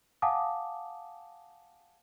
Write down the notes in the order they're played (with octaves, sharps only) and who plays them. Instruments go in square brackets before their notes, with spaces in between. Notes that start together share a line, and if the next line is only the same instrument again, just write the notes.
[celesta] F5 F#5 G#5 A5 D6 D#6